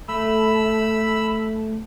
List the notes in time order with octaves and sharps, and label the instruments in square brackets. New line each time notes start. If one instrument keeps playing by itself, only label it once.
[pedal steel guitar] A3 [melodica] B5 E6